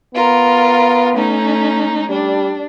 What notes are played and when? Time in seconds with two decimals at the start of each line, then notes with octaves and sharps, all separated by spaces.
0.14 B3 F4 A#4
1.14 A3 C#4 D#4
2.09 G3 D4